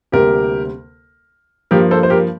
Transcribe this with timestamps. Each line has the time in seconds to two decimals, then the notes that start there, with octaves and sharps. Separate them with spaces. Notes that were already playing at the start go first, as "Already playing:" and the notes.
0.12 D2 C3 G3 A#3 G4 A#4
1.71 G2 F3 A#3 G4 A#4
1.91 A4 C5
2.03 C5
2.10 G4 A#4